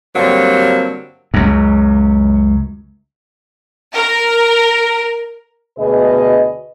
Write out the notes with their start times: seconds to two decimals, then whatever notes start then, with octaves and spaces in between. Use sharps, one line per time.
0.16 G2 D3 F#3 G3 A#3 C4
1.34 C#2 F#2
3.94 A#4
5.78 D2 B2 G#4 B4 D#5